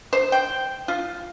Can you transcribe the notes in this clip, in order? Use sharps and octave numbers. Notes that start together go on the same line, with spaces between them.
C5
G5
F4